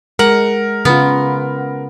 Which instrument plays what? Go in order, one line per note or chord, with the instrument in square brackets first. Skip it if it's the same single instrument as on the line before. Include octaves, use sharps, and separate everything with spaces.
[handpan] G#3 [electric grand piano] A#4 [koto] F#5
[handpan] C#3 F4 [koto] B3